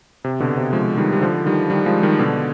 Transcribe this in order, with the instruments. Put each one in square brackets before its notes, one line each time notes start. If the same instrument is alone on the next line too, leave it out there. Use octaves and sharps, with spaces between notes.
[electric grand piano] C3
B2 D3
C3
F3 G#3
D#3 G3
G3
D3 F3
D#3 G3
D#3 G3
F3 G#3
D#3 G3
B2 D3